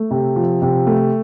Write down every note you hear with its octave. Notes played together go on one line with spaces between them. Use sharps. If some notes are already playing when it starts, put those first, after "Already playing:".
Already playing: A3
C3
F3
C3
A3